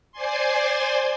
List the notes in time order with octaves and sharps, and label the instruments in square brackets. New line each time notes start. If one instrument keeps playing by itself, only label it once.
[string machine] C5 D5 G#5 C6